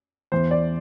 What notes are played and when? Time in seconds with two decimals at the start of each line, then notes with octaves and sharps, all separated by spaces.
0.32 E2 E3 C5
0.51 D5